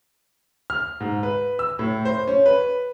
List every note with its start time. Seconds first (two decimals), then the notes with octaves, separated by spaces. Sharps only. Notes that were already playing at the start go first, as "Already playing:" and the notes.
0.70 F6
1.00 G#2
1.23 B4
1.59 E6
1.79 A2
2.05 C5
2.27 C#4
2.46 B4